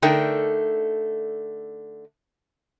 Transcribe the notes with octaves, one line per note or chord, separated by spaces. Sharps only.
D3 A3 D#4 A4 A#4 G5